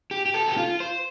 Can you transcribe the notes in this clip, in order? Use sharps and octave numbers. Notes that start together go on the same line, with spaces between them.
G4
G4
A4
G4
F4
C5